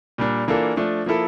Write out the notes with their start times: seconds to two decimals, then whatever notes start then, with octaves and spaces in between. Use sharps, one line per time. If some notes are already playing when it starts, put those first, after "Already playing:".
0.18 A#2 G3 D4
0.48 E3 A#3 D4 F4 A4
0.77 F3 A3 D4
1.06 F3 A#3 E4 A4